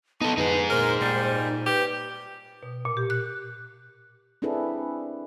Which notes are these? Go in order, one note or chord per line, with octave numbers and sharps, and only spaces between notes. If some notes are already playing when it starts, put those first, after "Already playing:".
B3 D#4 A4 A5
F2 D3 D#4 G#4 B4
F2 A#2 A#4 C5
A#2 G3
G4 B4
B2
A#2
G4
F#6
C4 D4 E4 G#4 A4 B4